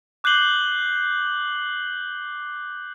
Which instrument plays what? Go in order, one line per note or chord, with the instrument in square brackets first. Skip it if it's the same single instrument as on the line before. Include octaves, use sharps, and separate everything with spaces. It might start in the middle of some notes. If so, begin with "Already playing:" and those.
[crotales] D6 F#6 G6 C7 F#7 G7